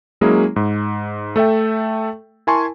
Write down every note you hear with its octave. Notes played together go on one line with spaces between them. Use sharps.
F#3 G#3 A#3 C#4 E4 G#4
G#2
A3 A4 E5 G5
E4 A#4 G#5 A5 C6 C#6